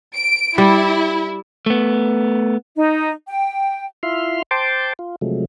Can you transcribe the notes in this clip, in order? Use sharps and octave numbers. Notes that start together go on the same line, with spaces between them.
D7
G3 E4
A3 B3
D#4
G5
E4 F4 E5 C6 F6
C5 G5 A5 C6 D6
F4
C3 F3 F#3 G#3 A3